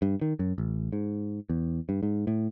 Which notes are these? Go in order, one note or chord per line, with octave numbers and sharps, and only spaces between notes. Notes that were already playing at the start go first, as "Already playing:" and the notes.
G2
D#3
F#2
A1
G#2
E2
G2
G#2
A2